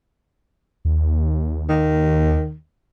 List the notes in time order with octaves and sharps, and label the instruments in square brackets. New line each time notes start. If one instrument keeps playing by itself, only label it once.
[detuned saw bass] D#2
[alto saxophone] D#3